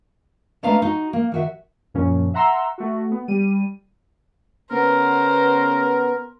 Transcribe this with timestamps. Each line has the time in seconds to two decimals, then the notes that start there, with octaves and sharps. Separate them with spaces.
0.63 G#3 A3 B3 D4 F5 A#5
0.82 D#4 F#4
1.13 A#3
1.32 D#3 F#4 E5
1.94 F#2 A#2 F3 C#4
2.34 E5 F#5 A#5 C6 E6
2.78 A3 F#4
3.11 B3
3.28 G3 D#7
4.71 C#3 B3 A#4 C5